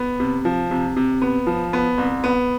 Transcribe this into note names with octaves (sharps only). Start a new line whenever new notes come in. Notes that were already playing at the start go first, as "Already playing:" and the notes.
Already playing: B3
C3
F3
C3
C3
B3
F3
B3
C2
B3